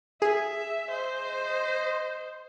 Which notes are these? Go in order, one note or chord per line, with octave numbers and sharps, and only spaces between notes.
G#4 E5
C5 D#5